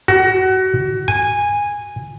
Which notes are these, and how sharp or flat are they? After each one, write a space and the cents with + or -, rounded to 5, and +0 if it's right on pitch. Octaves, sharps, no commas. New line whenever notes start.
F#4 +25
G#5 -15